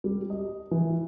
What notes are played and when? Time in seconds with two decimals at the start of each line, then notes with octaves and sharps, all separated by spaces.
0.04 G3
0.30 D#5
0.71 E3